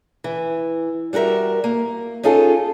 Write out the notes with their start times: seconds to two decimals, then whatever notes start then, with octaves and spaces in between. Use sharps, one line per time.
0.24 E3
1.13 G3 F#4 G4 A#4 E5
1.64 A#3
2.23 C#4 D#4 F4 G#4 A4